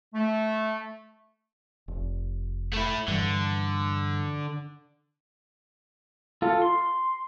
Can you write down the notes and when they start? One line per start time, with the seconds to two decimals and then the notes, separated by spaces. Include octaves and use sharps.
0.14 A3
1.88 F1
2.73 A3 E4
3.08 G2 D3 E3
6.42 F4 A4
6.62 C6